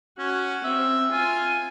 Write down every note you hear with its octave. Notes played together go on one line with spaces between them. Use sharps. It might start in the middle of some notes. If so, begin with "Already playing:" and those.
C#4 F#4
C4 E5
F4 G#5